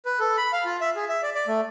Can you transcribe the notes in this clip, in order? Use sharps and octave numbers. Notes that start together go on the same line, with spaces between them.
B4
A4
B5
F5
F4
E5
G#4
E5
D5
D5
A3